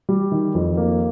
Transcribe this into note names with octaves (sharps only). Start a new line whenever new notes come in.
G3
D#3
F2
A#3